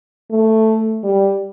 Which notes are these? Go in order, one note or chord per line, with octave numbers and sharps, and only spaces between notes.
A3
G3